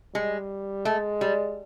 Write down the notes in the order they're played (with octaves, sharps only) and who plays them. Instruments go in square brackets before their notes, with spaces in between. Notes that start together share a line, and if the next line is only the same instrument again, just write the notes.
[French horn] G3 [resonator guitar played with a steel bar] G#3
[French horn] G#3 [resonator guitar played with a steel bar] A3
[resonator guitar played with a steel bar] G3